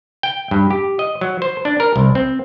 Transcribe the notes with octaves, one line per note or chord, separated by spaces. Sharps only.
G5
G2
G4
D#5
F#3
C5
D4
A#4
C2
C4